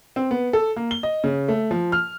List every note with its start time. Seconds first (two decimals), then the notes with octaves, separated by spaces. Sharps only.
0.16 C4
0.31 B3
0.53 A4
0.76 A#3
0.91 G7
1.03 D#5
1.24 C#3
1.48 A3
1.71 F3
1.92 F6